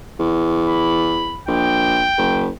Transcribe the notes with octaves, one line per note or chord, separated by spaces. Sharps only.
E2
B5
A#1 G5
F#1